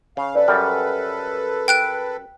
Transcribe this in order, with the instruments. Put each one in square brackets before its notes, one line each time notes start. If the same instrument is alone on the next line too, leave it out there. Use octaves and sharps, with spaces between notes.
[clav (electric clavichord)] C#3 [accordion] F5
[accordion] A4 B4 [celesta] D5
[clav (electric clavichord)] F#2 G3 [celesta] F6
[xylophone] G5 F#6 D7